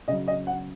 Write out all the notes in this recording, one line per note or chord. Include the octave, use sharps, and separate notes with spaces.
C#3 F#3 D#5
D#5
F#5